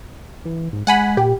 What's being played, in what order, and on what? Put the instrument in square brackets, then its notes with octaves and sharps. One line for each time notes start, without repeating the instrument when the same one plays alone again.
[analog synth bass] E3
G#2
[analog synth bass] G#3 [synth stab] F#5 G#5 B5
[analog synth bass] A#2 [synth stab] G4